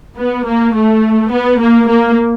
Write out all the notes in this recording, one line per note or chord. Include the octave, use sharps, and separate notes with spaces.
B3
A#3
A3
B3
A#3
A#3